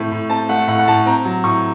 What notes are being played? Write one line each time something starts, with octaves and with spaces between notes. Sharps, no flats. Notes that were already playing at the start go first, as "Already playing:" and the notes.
Already playing: A2 A3 C4
A2
C4 A5
A3 F#5
A2 F#5
F#5
A2 A5
C4 A#5
F#3
A2 C#6